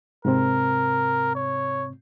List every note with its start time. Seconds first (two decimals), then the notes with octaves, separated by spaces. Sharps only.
0.25 G#2 C3 C4 A#4
1.35 C#5